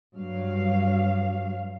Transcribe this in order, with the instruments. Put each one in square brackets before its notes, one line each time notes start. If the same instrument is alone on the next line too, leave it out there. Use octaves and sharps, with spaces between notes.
[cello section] G2 F#3 F5